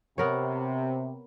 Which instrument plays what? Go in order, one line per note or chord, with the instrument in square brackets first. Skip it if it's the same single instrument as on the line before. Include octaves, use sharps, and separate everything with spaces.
[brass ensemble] C3 [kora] B3 A#4 C#5